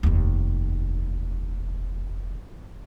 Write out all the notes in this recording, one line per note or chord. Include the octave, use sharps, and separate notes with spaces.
F1 D#2